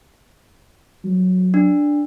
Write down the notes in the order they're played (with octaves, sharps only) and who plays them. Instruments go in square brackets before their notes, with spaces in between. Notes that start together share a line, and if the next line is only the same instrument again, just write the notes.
[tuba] F#3
[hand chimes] D4